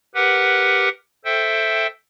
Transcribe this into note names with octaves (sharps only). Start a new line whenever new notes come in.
G4 A#4 B4 F#5
A4 C5 E5 G5